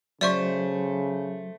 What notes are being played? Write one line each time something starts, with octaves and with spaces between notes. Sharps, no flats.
C#3 F#3 A3 C5 D5 E5 C#6